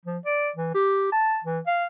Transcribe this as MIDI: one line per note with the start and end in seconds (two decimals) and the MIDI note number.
0.06 0.18 53
0.26 0.49 74
0.56 0.74 52
0.75 1.12 67
1.12 1.39 81
1.44 1.59 52
1.67 1.86 77